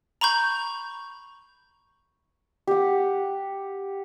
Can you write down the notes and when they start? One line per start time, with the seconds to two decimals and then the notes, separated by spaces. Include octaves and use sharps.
0.21 A#5 B5 C#6 G6
2.67 G4 F#5